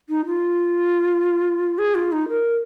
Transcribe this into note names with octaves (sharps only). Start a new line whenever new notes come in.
D#4
F4
G#4
F4
D#4
A#4